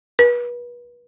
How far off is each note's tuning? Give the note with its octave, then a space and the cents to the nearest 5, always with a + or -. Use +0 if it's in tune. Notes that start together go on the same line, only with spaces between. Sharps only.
B4 -35